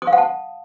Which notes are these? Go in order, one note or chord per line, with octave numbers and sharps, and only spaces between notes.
D#6
F5
F#5
A5